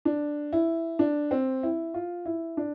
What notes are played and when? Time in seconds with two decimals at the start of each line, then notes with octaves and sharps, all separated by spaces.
0.05 D4
0.53 E4
0.99 D4
1.31 C4
1.63 E4
1.94 F4
2.25 E4
2.57 D4